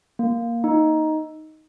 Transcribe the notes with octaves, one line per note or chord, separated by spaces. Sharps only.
A#3
D#4